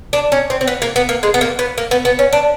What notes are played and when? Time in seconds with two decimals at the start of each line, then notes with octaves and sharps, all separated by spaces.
0.13 D4
0.32 C#4
0.50 C4
0.61 C4
0.68 B3
0.82 A#3
0.96 B3
1.09 A#3
1.23 G#3
1.34 B3
1.41 A#3
1.59 B3
1.78 A#3
1.91 B3
2.05 B3
2.19 C#4
2.33 D4